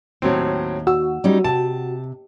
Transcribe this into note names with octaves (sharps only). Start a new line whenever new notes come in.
D#2 A2 F#3 C4
F#4 E6
G3 C#4 D#4
C3 A5